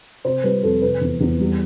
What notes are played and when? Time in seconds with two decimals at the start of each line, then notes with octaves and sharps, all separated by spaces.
0.24 C3 C5
0.44 G3 B4
0.63 F2 A4
0.82 C3 B4
1.01 E2
1.20 E2
1.39 G3